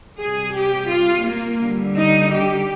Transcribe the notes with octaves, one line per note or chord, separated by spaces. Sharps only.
C3 G3 G#4
G4
F4
A#3
D3 G3
D#4
G4